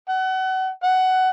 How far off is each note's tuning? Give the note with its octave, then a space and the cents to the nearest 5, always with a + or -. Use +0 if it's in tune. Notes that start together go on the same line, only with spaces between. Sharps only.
F#5 +30
F#5 +15